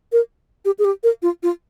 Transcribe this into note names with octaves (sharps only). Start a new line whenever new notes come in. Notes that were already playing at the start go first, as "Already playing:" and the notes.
A#4
G4
G#4
G4
A#4
F4
F4